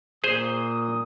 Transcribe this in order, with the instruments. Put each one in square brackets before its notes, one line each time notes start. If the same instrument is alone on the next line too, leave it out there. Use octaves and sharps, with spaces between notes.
[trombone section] A#2 [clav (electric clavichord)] G#4 C5 [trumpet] D#6